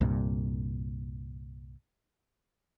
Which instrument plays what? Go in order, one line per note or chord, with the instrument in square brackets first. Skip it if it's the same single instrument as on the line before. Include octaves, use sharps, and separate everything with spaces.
[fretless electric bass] C2 G2 A#2